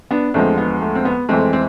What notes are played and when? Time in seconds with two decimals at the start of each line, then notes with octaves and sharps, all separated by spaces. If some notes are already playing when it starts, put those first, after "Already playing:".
0.11 B3 D4
0.34 E2 D3 F3 G#3 A3 C4
0.58 B3
0.82 A3
0.95 C4
1.05 B3
1.29 F2 E3 G#3 A3 C4
1.53 C4